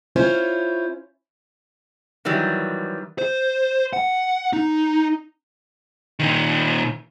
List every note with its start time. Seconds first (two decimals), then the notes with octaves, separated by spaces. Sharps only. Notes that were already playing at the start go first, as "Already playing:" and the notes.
0.16 C#4 E4 F4 C5 C#5
2.25 D#3 E3 F#3 G3
3.18 C5
3.93 F#5
4.53 D#4
6.19 A#2 D#3